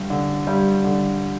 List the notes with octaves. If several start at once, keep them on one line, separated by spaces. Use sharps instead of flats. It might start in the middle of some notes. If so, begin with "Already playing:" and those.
Already playing: G2 D3 G3
D3
G2 G3
D3